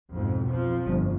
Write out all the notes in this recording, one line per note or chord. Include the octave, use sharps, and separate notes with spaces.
B1 F2 G#2
F2 F3
G1 F2